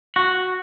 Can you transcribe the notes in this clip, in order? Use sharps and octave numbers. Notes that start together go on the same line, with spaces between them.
F#4